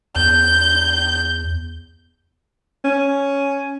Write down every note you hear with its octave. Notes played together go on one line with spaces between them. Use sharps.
E2 G6
C#4